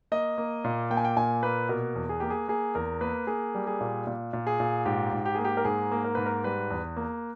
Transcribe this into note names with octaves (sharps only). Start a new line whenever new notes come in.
A#3 D#5
A#3
A#2
A#3 G5
G#5
G5
A#2 G#5
A#3 B4
B2 A#4
E2
G#4
A#3 G4
G#4
A#3 G#4
E2 A#4
A#3 B4
A#3 G#4
G3
G#4
A#2
A#2
A#2
G#4
A#2
G#2 G4
G#2
G4
A#3 G#4
G4
A#4
G#2 G#4
A#3
A#4
G#2 B4
A#4
G3 B4
E2
A#3